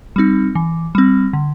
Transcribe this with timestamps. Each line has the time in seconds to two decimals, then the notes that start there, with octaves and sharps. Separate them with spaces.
0.16 G3 C4 D#4
0.55 E3
0.95 G3 C4
1.33 D3